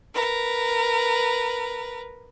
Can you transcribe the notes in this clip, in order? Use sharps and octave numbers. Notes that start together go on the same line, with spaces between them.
A#4 B4